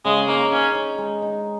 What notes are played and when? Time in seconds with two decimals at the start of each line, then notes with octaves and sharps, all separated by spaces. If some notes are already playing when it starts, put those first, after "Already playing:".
0.05 C#3 G#3
0.28 A#3 D#4
0.52 C#4 D#4
0.75 D#4
0.98 G#3
1.22 D#4